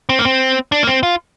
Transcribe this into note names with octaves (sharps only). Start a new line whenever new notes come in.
C4
A#3
C4
D4
A#3
C4
F4